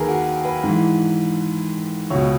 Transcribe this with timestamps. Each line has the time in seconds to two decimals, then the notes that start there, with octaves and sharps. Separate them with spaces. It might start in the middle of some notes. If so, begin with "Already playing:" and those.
Already playing: D#2 D#3 G#4 A#4 B4
0.08 F#4
0.45 B4
0.64 G#2 E3
2.10 C#2 B2 C#5